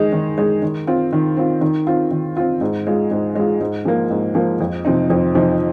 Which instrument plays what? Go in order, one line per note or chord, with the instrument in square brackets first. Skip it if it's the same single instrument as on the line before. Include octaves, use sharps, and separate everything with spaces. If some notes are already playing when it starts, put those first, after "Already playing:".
Already playing: [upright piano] D#3 G#3 D#4
D#3
G#3 D#4
D#3
C4 F4
D#3
C4 F4
D#3
C4 F4
D#3
C4 F4
G#2
G#3 F4
G#2
G#3 F4
G#2
F3 A#3
G#2
F3 A#3
F2
C3 F3 C4 D#4
F2
C3 F3 C4 D#4